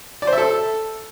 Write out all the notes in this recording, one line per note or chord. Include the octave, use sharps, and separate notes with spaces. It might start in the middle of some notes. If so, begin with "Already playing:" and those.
D5
C5
E5
A4